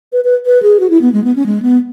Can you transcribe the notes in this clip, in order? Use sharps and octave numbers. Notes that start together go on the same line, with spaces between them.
B4
B4
B4
G#4
F#4
E4
B3
G#3
B3
C#4
G#3
B3